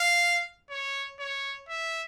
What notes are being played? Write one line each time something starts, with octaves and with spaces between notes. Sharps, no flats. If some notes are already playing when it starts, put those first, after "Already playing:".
Already playing: F5
C#5
C#5
E5